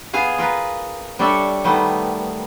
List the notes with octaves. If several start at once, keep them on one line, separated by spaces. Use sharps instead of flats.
B3 G#4 F5
F4 A#4 B4
G3 D4 A4 C#5 D5 E5
D#3 G3 A3 B3